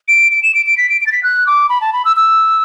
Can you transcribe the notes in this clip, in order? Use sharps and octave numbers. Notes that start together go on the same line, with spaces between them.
D7
D7
E7
D7
D7
B6
D7
D7
A6
B6
F#6
D6
B5
A5
B5
E6
E6